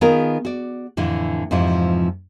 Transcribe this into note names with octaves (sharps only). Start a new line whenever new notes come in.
D#3 B3 F4 G#4 A#4
F#4 D5
F2 A2 D3 E3
F2 G#2 C3 E3 F3